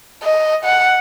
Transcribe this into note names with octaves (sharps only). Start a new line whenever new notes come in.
D#5
F#5